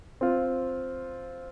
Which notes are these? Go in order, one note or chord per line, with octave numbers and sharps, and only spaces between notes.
C4 F4